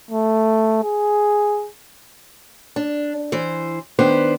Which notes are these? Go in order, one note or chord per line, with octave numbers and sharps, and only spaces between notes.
A3
G#4
D4
E3 C5
D#3 B3 D4 B4 C5